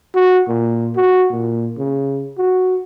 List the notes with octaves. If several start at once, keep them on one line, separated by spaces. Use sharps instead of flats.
F#4
A#2
F#4
A#2
C#3
F#4